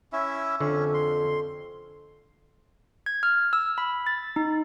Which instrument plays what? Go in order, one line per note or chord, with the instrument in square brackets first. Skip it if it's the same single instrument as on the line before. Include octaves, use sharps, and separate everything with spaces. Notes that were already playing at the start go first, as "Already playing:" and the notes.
[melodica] C#4 E4 E5
[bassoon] F2 [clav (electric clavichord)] D3 [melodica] C#4
[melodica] C6
[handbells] G#6
F6
E6
B5
A6
D#4